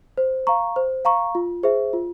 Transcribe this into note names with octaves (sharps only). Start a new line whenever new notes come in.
C5
F5 A#5 C#6
C5
F5 A#5 C#6
F4
G#4 C5 E5
F4